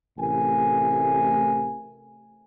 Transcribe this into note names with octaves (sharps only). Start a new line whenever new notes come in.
A1 A2 C3 A3 A#4 G#5